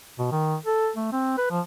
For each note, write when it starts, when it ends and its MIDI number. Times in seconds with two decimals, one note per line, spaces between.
0.19 0.27 47
0.32 0.56 51
0.66 0.90 69
0.96 1.08 57
1.12 1.38 60
1.38 1.47 71
1.50 1.61 53